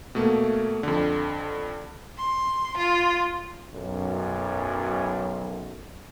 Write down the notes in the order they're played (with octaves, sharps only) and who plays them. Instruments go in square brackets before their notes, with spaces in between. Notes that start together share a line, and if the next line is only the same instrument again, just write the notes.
[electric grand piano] B2 A3 A#3
F2 D3
[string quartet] C6
F4
[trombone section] B1 F#2